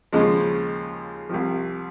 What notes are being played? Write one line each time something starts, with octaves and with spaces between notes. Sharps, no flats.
D#2 C#3 F3 G#3
C2 C3 F3